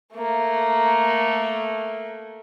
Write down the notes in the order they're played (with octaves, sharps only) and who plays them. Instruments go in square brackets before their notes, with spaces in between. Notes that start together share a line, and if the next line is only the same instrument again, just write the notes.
[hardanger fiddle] A3 A#3